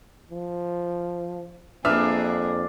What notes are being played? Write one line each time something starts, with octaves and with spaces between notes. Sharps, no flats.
F3
F2 A#3 D4 G#4 B4 E5 F6